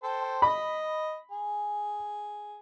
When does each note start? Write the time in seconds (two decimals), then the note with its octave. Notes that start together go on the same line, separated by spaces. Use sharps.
0.04 A4 C5 G5
0.42 D#5 B5
1.32 G#4